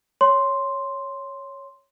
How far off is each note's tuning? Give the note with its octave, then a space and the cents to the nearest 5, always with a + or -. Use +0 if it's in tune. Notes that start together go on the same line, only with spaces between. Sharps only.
C#5 +0 C6 +0